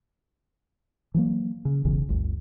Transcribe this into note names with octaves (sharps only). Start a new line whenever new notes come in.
E3 F#3 A#3
C#3
E1 B1 C#3 E3
G1 D2